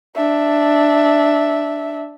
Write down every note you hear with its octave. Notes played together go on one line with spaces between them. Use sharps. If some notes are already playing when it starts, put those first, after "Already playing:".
D4 E5